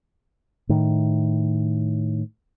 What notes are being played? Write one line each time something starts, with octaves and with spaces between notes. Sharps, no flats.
A2 D#3